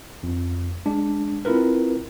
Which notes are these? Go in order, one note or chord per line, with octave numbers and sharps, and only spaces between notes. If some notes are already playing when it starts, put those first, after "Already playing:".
F2
G#3 D4
C4 E4 F4 A#4 B4